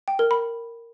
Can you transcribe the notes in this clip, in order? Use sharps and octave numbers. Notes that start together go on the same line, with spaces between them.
G5
A#4
B5